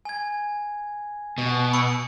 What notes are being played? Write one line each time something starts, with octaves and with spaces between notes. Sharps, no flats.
G#5 G#6
B2
B5 E6 C#7